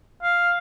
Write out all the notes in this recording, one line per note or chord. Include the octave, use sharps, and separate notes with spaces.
F5